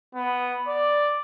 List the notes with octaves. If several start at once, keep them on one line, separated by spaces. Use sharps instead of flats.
B3
D5